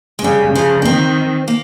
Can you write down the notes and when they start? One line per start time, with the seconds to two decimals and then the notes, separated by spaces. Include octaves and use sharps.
0.19 G#3
0.23 C#3 G3
0.55 C#3 F3
0.82 A#3
0.85 D#3 C4
1.48 A#3